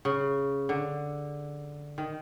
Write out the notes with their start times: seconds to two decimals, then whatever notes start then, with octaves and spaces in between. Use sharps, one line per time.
0.05 C#3
0.69 D3
1.98 D#3